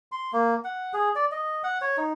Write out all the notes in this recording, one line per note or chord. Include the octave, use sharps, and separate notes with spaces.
C6
A#3
F#5
G#4
D5
D#5
F#5
C#5
D#4